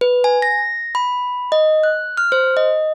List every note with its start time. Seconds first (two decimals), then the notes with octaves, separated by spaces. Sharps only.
0.01 B4
0.24 G#5
0.42 A#6
0.95 B5
1.52 D#5
1.83 F#6
2.17 F6
2.32 C5
2.57 D#5